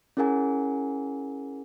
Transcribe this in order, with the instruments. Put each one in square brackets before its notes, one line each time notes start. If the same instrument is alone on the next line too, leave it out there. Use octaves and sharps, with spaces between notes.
[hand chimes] C#4 E4 G#4 A#4 F#5 G#5